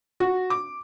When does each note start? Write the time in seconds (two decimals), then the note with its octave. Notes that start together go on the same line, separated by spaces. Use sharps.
0.20 F#4
0.50 D6